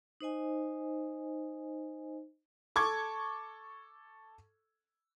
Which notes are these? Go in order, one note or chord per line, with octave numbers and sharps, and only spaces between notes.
D#4 C5 D#5 G#5
A4 C#6 D6 G#6